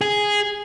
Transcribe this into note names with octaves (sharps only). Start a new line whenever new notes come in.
G#4